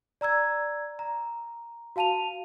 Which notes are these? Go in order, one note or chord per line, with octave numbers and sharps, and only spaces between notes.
D5 A#5 E6 G#6
A#5
F#4 F5 A5 D#7 F7